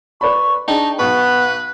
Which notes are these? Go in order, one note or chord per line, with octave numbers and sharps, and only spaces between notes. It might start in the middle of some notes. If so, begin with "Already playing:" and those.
B4 D5 B5 C#6
D4 D#4 G#4 G5 A5
B1 B3 B4 C#6 F#6